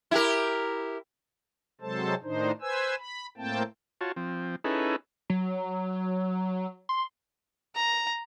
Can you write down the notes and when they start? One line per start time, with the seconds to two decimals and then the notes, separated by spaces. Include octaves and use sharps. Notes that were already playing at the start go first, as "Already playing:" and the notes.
0.11 E4 G4 A#4
1.81 C3 F#3 G#3 A4 C5 A5
2.24 A2 D#3 D4 D#4 C5
2.61 B4 C5 G#5 E6
2.99 B5
3.37 A2 A3 A#3 C4 G5 A5
4.01 F4 F#4 C#5 A5
4.16 F3 C4
4.64 C#4 D#4 E4 G#4 A4 B4
5.30 F#3
6.89 C6
7.75 A#5